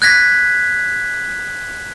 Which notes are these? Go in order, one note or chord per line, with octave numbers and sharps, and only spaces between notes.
F#6 G#6 A#6 B6